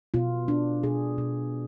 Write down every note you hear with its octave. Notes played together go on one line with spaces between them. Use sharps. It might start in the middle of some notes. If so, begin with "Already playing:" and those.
B2 F4
D4
B2 G#4
B2